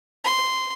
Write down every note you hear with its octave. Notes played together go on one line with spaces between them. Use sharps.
C6